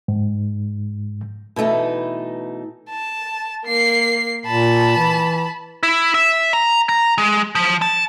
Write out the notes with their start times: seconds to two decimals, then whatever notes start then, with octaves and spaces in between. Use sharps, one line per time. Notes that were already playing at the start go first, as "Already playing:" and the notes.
0.08 G#2
1.56 B2 E3 A3 D#4
2.90 A5
3.66 A#3 C7
4.46 A#2 A5 B5
4.97 E3
5.83 E4
6.14 E5
6.53 A#5
6.89 A#5
7.18 G#3
7.55 F3
7.82 A5